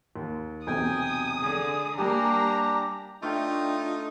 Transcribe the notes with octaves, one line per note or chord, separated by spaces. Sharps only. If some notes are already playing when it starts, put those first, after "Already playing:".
D#2
B1 E2 C3 G5 G#5 D#6
D3 G#4
G3 A#3 D4 G4 G#5 A#5
A3 D4 D#4 F4 F5 G5